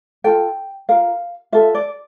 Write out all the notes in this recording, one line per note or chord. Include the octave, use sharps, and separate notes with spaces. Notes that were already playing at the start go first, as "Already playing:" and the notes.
F4 A4 G5
F4 A#4 F5
F4 A4 E5
D5